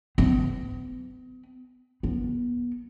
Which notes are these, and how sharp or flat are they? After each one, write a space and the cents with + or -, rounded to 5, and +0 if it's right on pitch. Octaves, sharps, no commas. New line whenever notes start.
B3 +45
B3 -30